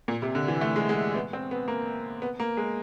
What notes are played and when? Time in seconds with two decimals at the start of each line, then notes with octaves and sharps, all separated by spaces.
0.08 A#2
0.22 C3
0.35 D3
0.48 E3
0.61 A3
0.76 G#3
0.89 G#3
1.15 B3
1.33 C4
1.51 B3
1.68 A#3
2.22 B3
2.40 A#3
2.57 G#3